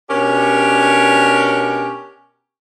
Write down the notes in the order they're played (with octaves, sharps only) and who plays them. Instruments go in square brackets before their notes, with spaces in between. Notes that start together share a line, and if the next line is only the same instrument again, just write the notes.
[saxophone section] B2 C#4 D4 G4 A#4 C#5